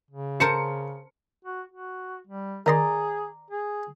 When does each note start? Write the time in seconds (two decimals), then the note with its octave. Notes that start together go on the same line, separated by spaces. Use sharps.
0.11 C#3
0.40 A#4 C5 A5 C#7
1.45 F#4
1.72 F#4
2.27 G3
2.66 D#3 G#4 D5 D#5 A#5 C6
3.51 G#4